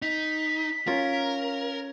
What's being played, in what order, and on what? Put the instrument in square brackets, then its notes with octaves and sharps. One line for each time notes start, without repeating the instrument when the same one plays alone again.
[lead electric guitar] D#4 [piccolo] B6
[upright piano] C#4 [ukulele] F4 [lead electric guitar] A#4